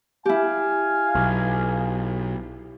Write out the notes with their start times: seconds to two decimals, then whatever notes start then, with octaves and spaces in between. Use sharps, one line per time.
0.26 E4 G4 F5 G#5
1.15 B1